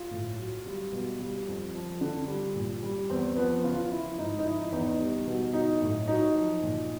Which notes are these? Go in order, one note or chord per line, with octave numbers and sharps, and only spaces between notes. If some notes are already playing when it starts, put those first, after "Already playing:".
Already playing: F4
A2
F#3
G3
B2
G3
F2
F3
D3
G3
A#2
G3
E2 C4
F3 B3
C#3 F4
F3 E4
G#2 D#4
D#4
F3 E4
E2 D#4
G3
B2
F#3 D#4
A2
F#3 D#4
F3
A#2